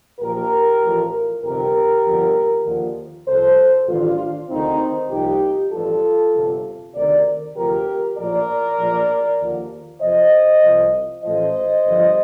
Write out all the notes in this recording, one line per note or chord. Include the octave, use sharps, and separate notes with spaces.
A#1 A#2 F3 G4 A#4
A1 A2 F3
G1 F2 C3 D#3 G4 A#4
G1 F2 D3 F3
D#2 D3 F3
C2 C3 F3 A4 C5
A1 G2 D#3 D4 F4
D2 C3 D#3 C4 D#4
C2 A#2 F3 D#4 G4
A1 G2 F3 F4 A4
G1 F2 C3
D2 C3 D#3 A#4 D5
D2 C3 F3 G4 A#4
A#1 A2 F3 A#4 D5
A#1 A2 F3
D#2 D3 F3
F2 C3 F3 C5 D#5
C2 C3 F3
A1 A2 F3 C5 D#5
G1 G2 F3